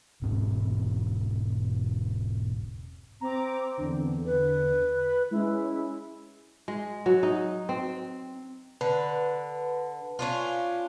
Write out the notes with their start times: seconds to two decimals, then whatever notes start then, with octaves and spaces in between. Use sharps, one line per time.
0.22 E1 G#2 C4
3.21 C4 A#5 D6
3.78 E2 D3
4.26 B4
4.98 B5
5.31 G#3 C#4 E4
6.68 G#3
7.06 F#3
7.23 D#4
7.69 C4
8.81 D3 B4
10.19 C#4 D4 F4